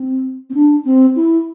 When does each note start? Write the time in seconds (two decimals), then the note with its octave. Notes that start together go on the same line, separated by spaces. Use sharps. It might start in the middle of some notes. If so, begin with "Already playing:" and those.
Already playing: C4
0.50 C4
0.54 D4
0.85 C4
1.16 E4